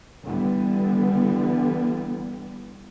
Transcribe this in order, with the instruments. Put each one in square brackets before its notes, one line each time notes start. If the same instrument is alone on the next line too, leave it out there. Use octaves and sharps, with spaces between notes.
[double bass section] D3 E3 G3 B3